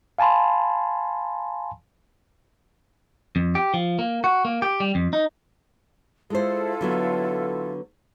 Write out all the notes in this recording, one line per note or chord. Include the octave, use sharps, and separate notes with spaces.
F5 G#5 A5 B5 C6
F2
G4
F3
A#3
F#4
A#3
G4
G3
F2
D#4
G#3 E4 F4 A4 C5
D3 F#3 B3